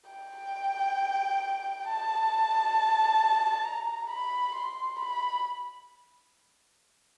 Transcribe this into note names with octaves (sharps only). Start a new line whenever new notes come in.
G5
A5
A#5
B5
C6
B5